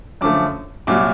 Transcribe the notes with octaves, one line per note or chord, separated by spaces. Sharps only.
F#2 D3 F3 A3 D6
C2 A#2 F#3 D6